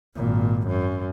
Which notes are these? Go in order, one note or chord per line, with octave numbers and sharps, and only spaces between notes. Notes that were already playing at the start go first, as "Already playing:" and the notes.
G#1 A#2
F#2